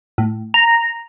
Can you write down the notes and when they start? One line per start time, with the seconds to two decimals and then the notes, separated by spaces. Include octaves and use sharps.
0.18 A2
0.54 A#5